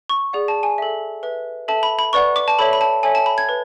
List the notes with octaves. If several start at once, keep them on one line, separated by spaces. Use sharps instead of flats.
C#6
G#4 D5 F#5
A5
G#5
A4 E5
B4 E5
A4 E5 A5
B5
B5
B4 D5 F#5 C#6
D6
A5
A4 C#5 E5 B5
B5
A5
A4 C#5 E5 G#5
A5
B5
G#6
B4